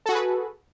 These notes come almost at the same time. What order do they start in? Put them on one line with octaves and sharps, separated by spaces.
A4 F#4 G#4 B4